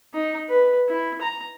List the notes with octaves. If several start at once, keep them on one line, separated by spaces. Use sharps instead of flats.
D#4
B4
E4
A#5